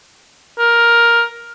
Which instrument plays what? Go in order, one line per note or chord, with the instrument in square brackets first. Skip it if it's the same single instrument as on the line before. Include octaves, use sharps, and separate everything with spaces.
[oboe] A#4